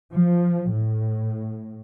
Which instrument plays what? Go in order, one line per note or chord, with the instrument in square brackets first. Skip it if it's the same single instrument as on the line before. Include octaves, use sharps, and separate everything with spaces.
[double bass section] F3
A2